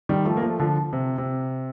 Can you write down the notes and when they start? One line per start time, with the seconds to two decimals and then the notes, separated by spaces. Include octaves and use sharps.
0.09 D#3 G3
0.25 F3 A3
0.37 A#3
0.43 F3 A3
0.59 D3 F3
0.93 C3
1.18 C3